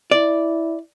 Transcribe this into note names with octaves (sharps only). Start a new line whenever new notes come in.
E4 D5